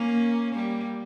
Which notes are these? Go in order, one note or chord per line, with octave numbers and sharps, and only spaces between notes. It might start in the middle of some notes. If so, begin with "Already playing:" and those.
Already playing: A#3 C#4
G3 A#3